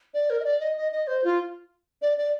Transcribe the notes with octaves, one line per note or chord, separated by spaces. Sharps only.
D5
A#4
D#5
D5
D#5
D#5
D#5
C5
F4
D5
D5